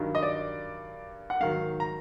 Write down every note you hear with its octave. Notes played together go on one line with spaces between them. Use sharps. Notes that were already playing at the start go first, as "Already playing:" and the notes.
Already playing: G2 D#3 F#3
D#5
D5
F#5
G#2 D#3 F#3 F5
A#5